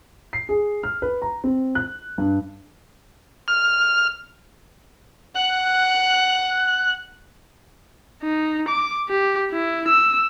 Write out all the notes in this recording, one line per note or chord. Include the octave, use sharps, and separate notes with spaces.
C7
G#4
F6
B4
A#5
C4
F#6
G2
F6
F#5 F#6
D#4
D6
G4
E4
E6